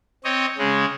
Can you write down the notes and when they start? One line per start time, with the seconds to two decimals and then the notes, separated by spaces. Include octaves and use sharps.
0.24 C4 C#5 D#5
0.58 C#3 G#3